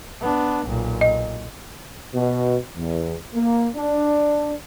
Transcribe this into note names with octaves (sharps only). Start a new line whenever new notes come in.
B3 D4
B1 A#2
D#5
B2
E2
A#3
D4